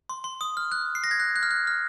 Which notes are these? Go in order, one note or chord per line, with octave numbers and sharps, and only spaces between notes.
C6
C6
D#6
F6
F#6
C7
A#6
G#6
F#6
F#6
F6
F#6
F6